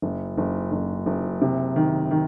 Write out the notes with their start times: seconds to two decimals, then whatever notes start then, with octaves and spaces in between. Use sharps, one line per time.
0.02 F#1
0.38 F#1
0.72 F#1
1.06 F#1
1.41 C3
1.76 D#3
2.11 D#3